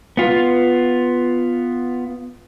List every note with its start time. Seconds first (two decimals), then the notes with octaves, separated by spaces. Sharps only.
0.17 B3 F4